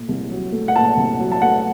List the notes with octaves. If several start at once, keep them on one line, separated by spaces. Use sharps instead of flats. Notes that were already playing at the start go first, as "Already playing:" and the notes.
Already playing: A#2 A3
C2
F#3
A3
F#5
A#2 A5
C2
F#3
A5
A3 F#5